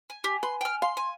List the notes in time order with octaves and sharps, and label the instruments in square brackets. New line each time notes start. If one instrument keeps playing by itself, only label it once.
[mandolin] G#5
[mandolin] G4 [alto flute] G#5
[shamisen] B4 [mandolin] C6
[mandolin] G5 F6
[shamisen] F5 [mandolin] C6
[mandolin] G#5 [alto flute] C6